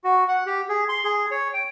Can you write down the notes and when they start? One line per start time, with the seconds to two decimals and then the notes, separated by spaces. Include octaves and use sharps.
0.04 F#4
0.28 F#5
0.46 G4
0.69 G#4
0.89 C6
1.04 G#4
1.31 C#5
1.54 G5